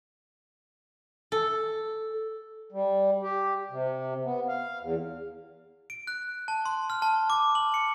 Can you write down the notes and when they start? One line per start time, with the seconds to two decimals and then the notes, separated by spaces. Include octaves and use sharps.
1.32 A4
2.72 G3
3.23 G4
3.71 C3
4.24 B3
4.48 F5
4.81 E2
5.90 D7
6.07 F#6
6.48 A5
6.65 C6
6.90 F6
7.02 A5
7.30 D6
7.55 F#7
7.74 C#7